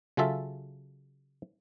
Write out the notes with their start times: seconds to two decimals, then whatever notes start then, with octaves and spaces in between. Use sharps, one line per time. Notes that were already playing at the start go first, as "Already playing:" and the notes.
0.17 C#3 F#3 C#4 F4 A4 E5